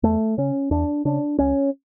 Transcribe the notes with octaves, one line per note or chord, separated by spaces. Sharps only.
E2 A3
C#3 C#4
E2 D4
C#3 D4
C#2 C#4